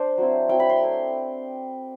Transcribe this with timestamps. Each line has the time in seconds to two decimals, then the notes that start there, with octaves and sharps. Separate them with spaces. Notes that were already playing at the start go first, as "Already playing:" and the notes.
Already playing: D4 C5 D5
0.18 F#3 C4 E4
0.49 F#3 C4 E4 G5
0.60 B5
0.70 C6
0.80 A3 E4